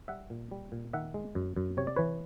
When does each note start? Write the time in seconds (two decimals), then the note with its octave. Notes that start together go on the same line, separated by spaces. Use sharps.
0.08 G3 E5 F#5
0.30 A#2
0.51 G3
0.72 A#2
0.93 D#3 E5 F#5
1.14 G#3
1.35 F#2
1.56 F#2
1.77 C3 C#5
1.87 D5
1.96 E3 B4 C#5